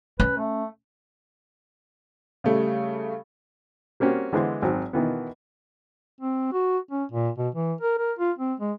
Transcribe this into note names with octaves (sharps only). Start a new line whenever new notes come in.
C#4 B4
A3
C#3 G3 A3
G3 A#3 C4 C#4 F#4
D3 E3 G#3 B3 E4 C5
G#1 F#3 C4
B2 D#3 E3 B3
C4
F#4
C#4
A#2
B2
E3
A#4
A#4
F4
C4
G#3